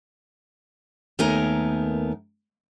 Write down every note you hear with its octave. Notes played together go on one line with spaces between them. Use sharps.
D#2 A3 B3 D#4 A#4 G#5